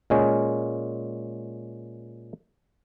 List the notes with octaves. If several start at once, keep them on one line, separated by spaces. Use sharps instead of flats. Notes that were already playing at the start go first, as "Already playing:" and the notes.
A#2 G#3 C#4